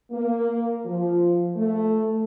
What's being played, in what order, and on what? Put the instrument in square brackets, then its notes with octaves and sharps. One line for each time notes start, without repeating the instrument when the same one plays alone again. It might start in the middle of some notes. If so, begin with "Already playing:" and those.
[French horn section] A#3
F3
A3